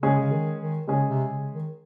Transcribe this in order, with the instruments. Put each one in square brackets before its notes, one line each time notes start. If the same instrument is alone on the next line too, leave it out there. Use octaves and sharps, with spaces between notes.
[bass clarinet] C#3 [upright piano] G#3 C#4 G#4
[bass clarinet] C#3
D#3
D#3
[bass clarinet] C#3 [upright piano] G#3 C#4 G#4
[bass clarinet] C3
C#3
D#3